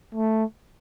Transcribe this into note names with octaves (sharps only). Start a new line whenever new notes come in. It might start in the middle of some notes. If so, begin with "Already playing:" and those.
A3